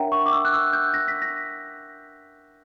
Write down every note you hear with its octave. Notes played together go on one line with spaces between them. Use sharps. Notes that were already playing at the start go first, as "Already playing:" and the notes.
Already playing: D4 A#4 C#5 E5 F#5 G5 A#5
C#6
D6
E6
F#6
E6
G6
A#6
B6
A#6